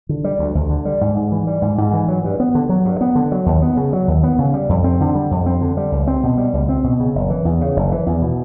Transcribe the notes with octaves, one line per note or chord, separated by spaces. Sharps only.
D3
G3
D2
D2
D3
G3
G#2
G#2
E3
G3
G#2
G#2
E3
F#3
G2
B3
D3
F#3
G2
B3
D3
F#3
D#2
B3
C#3
F#3
D#2
B3
C#3
G3
F2
C4
D3
G3
F2
C4
D3
G3
C#2
C4
B2
G3
C#2
C4
B2
C#3
F#1
E3
E2
C#3
F#1
E3
E2
B2